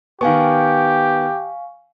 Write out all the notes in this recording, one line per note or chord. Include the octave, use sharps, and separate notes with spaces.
D#3 B3 G4 F5 G#5 C#6